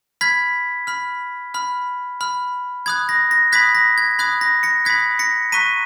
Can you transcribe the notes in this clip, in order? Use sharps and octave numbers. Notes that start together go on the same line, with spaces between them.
B5 F6 G#6 B6
B5 F6
B5 F6
B5 F6
B5 D#6 F#6 G#6
A#6
A#6
B5 D#6 F#6 G#6 B6
A#6
G#6
B5 D#6 F#6 G#6
A#6
A#6 C#7
B5 D#6 F#6 G#6 B6
A#6 C#7
A#5 C#6 F#6 B6 D#7